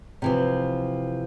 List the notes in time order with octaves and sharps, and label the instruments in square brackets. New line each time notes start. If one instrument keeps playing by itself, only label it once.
[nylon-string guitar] C3 E3 F3